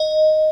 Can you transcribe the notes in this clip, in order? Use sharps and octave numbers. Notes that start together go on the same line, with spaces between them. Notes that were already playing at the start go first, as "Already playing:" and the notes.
Already playing: D#5